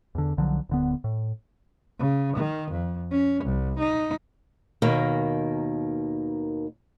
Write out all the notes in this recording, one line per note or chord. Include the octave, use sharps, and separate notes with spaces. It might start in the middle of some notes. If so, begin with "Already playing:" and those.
E2 D3
B1 D3 F3 F#3
D1 D3 B3
A2
C#3
D#3
F2
C#4
C2
D#4
D#2 B2 D#3 A#3